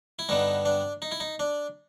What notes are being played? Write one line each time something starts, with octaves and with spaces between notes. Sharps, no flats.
E4
G2 D3 G3 B3 D#4
D4
D#4
E4
D#4
D4